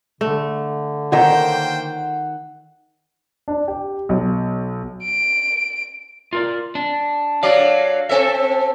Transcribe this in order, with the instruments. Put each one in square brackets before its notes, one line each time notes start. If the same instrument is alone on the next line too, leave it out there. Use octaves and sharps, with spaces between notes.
[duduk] D3 [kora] A3
[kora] D#3 C#5 [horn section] A#3 C5 G5 [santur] F#5 E6
[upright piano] D4
G4
B1
[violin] D7
[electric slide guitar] F4 A#4 D5
D4
[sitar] F#3 D4 D5 [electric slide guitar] F5
[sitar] C4 A4 E5